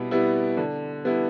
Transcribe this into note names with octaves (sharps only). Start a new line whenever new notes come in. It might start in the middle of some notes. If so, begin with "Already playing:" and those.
Already playing: B2 G3 B3 E4
G3 B3 E4
D3
G3 B3 E4